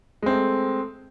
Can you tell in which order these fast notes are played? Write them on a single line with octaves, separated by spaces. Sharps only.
G#3 C4 A3